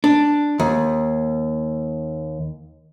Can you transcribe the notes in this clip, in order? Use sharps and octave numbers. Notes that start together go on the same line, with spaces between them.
D4
D#2